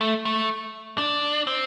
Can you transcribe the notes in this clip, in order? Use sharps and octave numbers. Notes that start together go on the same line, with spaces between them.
A3
A3
D4
C4